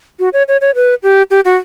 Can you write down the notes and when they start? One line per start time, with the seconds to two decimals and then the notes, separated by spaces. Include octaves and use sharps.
0.19 F#4
0.33 C#5
0.48 C#5
0.61 C#5
0.75 B4
1.03 G4
1.31 G4
1.45 F#4